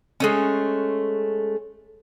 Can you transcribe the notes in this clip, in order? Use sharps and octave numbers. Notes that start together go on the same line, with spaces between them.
G#3 A3 C#4